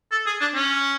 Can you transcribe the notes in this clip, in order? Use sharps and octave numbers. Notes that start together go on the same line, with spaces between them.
A4
G#4
D4
C#4